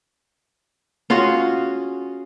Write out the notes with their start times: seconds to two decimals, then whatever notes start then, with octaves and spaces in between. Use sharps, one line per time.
1.10 C#4 F4 F#4 G#4